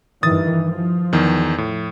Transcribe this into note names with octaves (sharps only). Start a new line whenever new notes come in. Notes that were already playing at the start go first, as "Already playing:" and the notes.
G2 D#3 E3 D#6 A6
F3
E2 D#3
A2